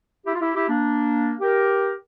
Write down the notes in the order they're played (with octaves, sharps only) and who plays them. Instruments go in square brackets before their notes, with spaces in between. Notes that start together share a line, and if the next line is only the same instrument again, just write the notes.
[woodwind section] E4 G4
F4
E4 G4
E4 G4
A#3 D4
G4 A#4